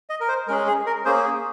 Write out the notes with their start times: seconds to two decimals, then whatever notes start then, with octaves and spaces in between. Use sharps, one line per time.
0.10 D#5
0.20 A#4
0.28 C5
0.47 G#3 C#4 G#4 A#4
0.67 G#4
0.86 A#4
1.05 A#3 C#4 G#4 C5
1.24 G#4